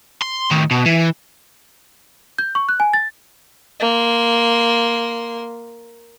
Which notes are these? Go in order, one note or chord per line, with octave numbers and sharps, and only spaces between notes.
C6
A2 D#3
B2
E3
G6
C#6
F#6
G#5
A6
A#3 C6